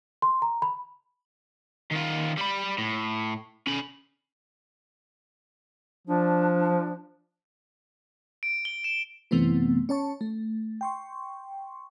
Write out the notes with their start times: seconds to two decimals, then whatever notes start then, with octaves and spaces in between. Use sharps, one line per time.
0.22 C6
0.42 A#5
0.62 B5
1.92 D#3 F4
2.37 G3 B5
2.78 A2
3.67 C#4 B5
6.07 F3 D4
8.43 D7
8.65 G7
8.84 E7
9.31 F#2 C3 E3 A3 B3 C4
9.89 C#4 C#5 A5 C#6
10.21 A3
10.81 G5 C6 C#6